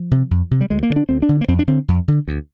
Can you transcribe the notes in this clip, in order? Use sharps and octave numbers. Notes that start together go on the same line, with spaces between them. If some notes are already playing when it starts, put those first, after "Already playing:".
Already playing: F3
C3
F2
C3
G3
D2 G#3
A#3
D3
D4
D2 C4
D4
D3
A#3
F2 C4
D4
D3 C4
F2
D3
D2